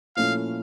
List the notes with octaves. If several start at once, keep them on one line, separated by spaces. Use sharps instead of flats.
A#2 F3 A3 C#4 E4 F5